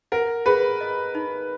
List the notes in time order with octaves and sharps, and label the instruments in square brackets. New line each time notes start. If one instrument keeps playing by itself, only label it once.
[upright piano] A#4 [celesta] F#5
[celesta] G#4 [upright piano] B4
[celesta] D#5
D#4